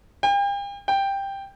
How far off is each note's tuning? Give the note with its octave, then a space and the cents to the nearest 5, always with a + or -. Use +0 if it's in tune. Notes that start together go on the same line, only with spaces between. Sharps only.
G5 +40
G5 +5